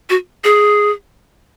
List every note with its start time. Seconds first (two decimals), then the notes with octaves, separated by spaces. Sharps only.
0.10 F#4
0.44 G#4